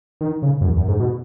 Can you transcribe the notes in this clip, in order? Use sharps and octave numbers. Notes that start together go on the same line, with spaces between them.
D#3
C#3
F#2
E2
F#2
G#2
B2